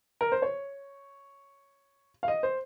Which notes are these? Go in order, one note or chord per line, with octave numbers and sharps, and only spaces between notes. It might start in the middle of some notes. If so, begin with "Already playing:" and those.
A#4
C5
C#5
F5
D#5
C5